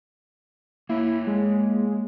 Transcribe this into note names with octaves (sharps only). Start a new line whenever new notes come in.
A#3 E4 C#5
G#3